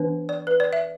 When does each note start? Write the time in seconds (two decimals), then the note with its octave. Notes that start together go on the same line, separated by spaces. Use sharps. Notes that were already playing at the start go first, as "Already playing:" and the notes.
Already playing: E3 B3 D4 B4
0.29 D5
0.47 B4
0.60 D5
0.73 E5